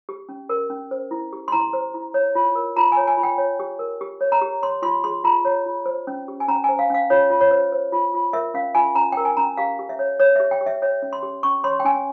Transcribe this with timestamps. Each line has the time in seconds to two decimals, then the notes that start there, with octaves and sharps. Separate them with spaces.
0.09 G4
0.29 C#4
0.49 A#4
0.70 C#4
0.91 C5
1.11 E4
1.33 G4
1.48 C6
1.52 E4 A#5
1.73 C5
1.94 E4
2.14 C#5
2.35 F4
2.55 A#4
2.77 F4 A#5
2.92 C#5 G#5
3.07 G#5
3.17 F4
3.23 G5
3.38 C#5
3.60 G4
3.79 A#4
4.01 G4
4.21 C#5
4.32 A#5
4.42 G4
4.62 C#5 C6
4.82 F4 C6
5.04 G#4 C6
5.24 F4 A#5
5.45 C#5
5.66 F4
5.86 C5
6.07 C#4
6.28 G4
6.40 G#5
6.48 C#4 A#5
6.64 C5 G#5
6.79 F5
6.90 C#4 F5
7.10 F4 C#5
7.30 F4
7.41 C#5
7.51 C5
7.72 C5
7.92 F4
8.14 F4
8.33 A#4 E5
8.54 C#4 F5
8.75 F4 G#5
8.95 C#4 A#5
9.12 A#4 G5
9.25 G#5
9.37 C#4 A#5
9.57 G4 F5
9.79 G4
9.89 E5
9.99 C#5
10.20 C#5
10.36 G4 E5
10.51 G5
10.61 G4
10.66 E5
10.82 C#5 E5
11.02 C#4
11.13 C6
11.23 G4
11.43 C#4 C#6
11.64 C#5 C6
11.80 G5
11.85 C#4 G#5